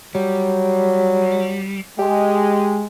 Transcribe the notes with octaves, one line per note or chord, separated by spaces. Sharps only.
F#3 G3
G#3 G4